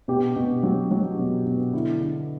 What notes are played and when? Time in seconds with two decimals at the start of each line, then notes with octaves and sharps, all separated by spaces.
0.08 B2 G4
0.36 B2
0.63 F#3
0.91 F#3
1.19 B2
1.47 B2
1.73 D3 E4
2.01 D3